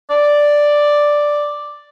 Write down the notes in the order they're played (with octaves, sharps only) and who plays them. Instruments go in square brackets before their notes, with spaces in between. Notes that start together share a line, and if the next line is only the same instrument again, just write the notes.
[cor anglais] D5